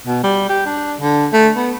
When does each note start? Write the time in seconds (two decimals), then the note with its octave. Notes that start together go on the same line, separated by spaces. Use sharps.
0.07 B2
0.24 G3
0.49 G4
0.66 D4
1.01 D3
1.33 A3
1.56 B3